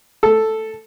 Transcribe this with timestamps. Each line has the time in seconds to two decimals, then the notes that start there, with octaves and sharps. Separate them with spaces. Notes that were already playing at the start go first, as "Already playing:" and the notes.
0.23 A4